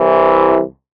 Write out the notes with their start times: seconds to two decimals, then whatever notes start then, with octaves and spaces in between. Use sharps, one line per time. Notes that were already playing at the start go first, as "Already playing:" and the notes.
Already playing: C2 C3 E3